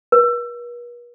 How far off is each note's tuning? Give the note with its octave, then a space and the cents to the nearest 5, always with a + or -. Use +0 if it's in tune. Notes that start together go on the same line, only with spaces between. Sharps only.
B4 -45